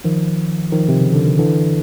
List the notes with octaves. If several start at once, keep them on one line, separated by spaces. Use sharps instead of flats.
D#3 F3
D#3 F3
C3
C#3
D3
D#3
D3 E3